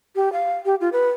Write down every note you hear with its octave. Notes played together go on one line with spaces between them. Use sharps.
G4
F5
G4
F4
B4